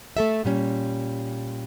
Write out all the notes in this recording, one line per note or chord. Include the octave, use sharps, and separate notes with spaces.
A3 A4 E5
A#2 G3 C#4